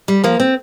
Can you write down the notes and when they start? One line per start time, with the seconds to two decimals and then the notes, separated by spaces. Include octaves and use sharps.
0.08 G3
0.24 F3 A#3
0.40 C4